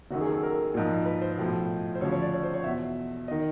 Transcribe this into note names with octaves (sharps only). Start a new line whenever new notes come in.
F#1 F#2 D#3 F#4
G#4
A4
A#4
A#1 G#2 F3
B4
C5
B1 A2 F3
C5
D2 C#3 F3 C#5
C#5
D5
C#5
C5
C#5
E2 B2 E5
D#3 D#5